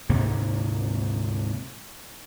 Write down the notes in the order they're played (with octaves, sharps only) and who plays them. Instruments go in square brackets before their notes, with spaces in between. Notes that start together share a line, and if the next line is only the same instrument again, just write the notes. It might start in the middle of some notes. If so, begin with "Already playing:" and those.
[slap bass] D2 G#2 C3 A#3